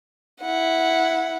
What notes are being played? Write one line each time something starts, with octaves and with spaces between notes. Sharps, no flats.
E4 F#5